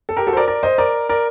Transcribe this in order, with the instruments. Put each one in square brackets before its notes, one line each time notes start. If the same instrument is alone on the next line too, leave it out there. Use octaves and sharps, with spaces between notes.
[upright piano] A4
G4 A#4
F#4 A4
C5
A#4 D5
A#4 D5
C5 D#5
A#4 D5
A#4 D5